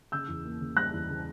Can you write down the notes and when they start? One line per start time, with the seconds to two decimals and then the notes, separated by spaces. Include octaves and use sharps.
0.12 C#3 E6 G6
0.28 E2
0.45 A#3
0.61 C#3
0.77 G3 F#6 A#6
0.93 E2
1.09 C#3